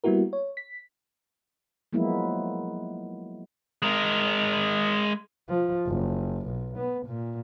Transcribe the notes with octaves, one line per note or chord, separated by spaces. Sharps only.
G3 A#3 B3 E4 F#4 A#4
C#5
B6
F3 F#3 G#3 A#3 B3 E4
G#3 A#4
F3
F#1
B1
B3
A#2